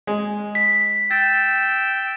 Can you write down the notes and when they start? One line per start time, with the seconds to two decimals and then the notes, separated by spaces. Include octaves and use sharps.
0.07 G#3
0.55 B6
1.11 G5 E6 A6